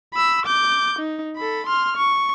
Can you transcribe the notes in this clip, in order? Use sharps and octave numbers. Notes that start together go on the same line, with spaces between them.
B5 E6
D6 G6
D#4
A4 B5
C6 F6
C#6